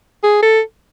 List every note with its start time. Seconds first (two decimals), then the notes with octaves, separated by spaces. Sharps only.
0.23 G#4
0.43 A4